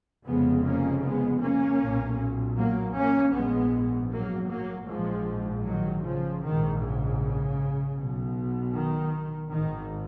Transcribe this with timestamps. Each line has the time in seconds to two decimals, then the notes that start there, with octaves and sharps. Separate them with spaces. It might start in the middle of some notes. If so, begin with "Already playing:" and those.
0.26 F1 F2 C#3 G#3 B3
0.65 A#3 C#4
1.04 G#3 B3
1.42 A#3 C#4
1.80 B1 A#2
2.58 F#3 A#3
2.96 A#3 C#4
3.35 A#1 G#2 G#3 B3
4.12 F#3 A#3
4.50 F#3 A#3
4.89 A#1 G#2 F3 G#3
5.66 D#3 F#3
6.05 C#3 F3
6.43 A#1 G#2 D#3
6.82 C#3
7.97 B1 B2
8.75 D#3
9.52 G#1 G#2 D#3